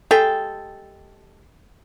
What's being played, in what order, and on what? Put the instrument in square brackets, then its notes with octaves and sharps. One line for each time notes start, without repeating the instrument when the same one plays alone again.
[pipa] G#3 G4 G5 [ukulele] A4